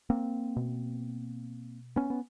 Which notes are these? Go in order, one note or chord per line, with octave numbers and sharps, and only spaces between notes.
A#3 C4
B2
B3 C#4
B3